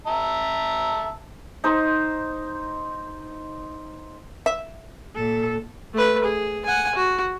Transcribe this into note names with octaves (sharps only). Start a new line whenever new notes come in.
E5 A5 A#5
D#4 C5 D#6
E5
A#2 A4
A3 B4
G#4
F#5 G#5
F#4